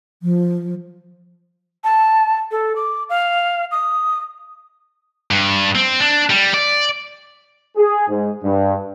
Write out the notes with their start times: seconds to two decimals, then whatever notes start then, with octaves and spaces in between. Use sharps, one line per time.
0.23 F3
1.84 A5
2.51 A4
2.76 D6
3.09 F5
3.71 D#6
5.31 G2
5.75 C4
6.00 D4
6.30 G3
6.54 D5
7.77 G#4
8.09 G#2
8.44 G2